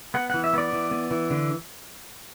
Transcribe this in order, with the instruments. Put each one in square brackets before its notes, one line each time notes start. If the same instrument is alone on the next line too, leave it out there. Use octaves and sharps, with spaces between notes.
[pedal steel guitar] B3 F#5
E3 F#5
E5
B3 D5
E3
B3
E3
D3